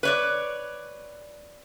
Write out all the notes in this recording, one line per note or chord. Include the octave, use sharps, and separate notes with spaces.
B4 C#5 D5